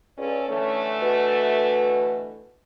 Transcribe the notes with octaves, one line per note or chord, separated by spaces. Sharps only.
C#2 C#4 A4 D5
D3 E3 A3 C#4
B2